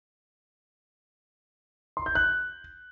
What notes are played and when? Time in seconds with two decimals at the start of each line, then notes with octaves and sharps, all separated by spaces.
1.97 C6
2.06 G6
2.15 F#6